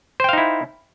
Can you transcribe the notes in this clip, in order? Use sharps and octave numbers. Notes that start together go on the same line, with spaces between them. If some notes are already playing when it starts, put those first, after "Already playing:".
D#4 E4 C5 F5 G5